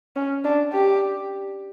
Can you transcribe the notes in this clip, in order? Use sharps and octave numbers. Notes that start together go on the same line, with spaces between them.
C#4
D4
G4